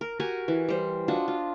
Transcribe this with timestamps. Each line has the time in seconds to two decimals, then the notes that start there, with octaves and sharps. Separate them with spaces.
0.01 A#4
0.20 F#4 G4 A#4 G#5
0.48 E3
0.69 G3 C5
1.08 D4 F4 F#4 D#5
1.28 F4